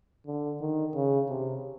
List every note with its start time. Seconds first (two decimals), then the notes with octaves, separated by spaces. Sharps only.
0.26 D3
0.61 D#3
0.95 C#3
1.30 C3